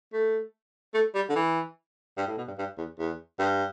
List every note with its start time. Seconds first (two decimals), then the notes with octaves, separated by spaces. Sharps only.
0.13 A3
0.94 A3
1.15 G3
1.29 D3
1.36 E3
2.18 G2
2.27 A2
2.37 B2
2.48 G2
2.58 G2
2.78 E2
2.99 E2
3.39 G2